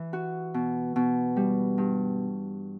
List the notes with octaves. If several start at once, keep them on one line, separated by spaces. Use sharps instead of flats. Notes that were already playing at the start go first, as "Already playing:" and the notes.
Already playing: E3
F#4
B2
B2
G3
G2